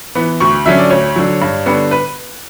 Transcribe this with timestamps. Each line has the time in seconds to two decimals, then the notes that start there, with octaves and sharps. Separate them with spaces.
0.15 E3 B3
0.40 D2 C#6
0.66 D3 F#3 C#4 E5
0.78 D5
0.90 D2 C#5
1.16 D3 F#3
1.41 G2
1.66 D3 G3 B3
1.91 B4